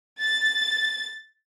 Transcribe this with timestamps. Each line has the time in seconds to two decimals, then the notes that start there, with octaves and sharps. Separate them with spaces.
0.19 A6